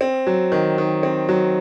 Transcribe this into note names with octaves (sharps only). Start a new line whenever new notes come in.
C4
F#3
D#3
D#3
C4
F#3